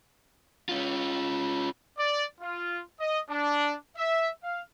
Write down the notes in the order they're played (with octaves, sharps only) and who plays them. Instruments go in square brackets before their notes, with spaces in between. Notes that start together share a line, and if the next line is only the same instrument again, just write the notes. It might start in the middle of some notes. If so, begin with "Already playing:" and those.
[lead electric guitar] C#4 F4
[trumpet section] D5
F4
D#5
D4
E5
F5